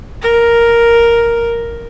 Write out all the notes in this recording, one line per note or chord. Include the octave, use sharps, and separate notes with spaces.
A#4